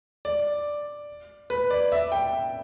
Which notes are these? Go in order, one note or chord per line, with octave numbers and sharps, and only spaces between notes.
D5
B4
D5
E5
G5